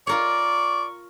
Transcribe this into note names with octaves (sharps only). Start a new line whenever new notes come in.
F4 A#4 C#5 D5 C#6